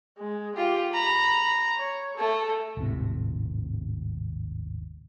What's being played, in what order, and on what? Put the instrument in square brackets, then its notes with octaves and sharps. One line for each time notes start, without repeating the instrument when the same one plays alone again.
[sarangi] G#3
[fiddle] F4 [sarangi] G4
[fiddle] A#5 [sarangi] B5
[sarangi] C#5
[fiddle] A3 [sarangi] A4
[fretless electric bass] D#1 G#1 A2 C3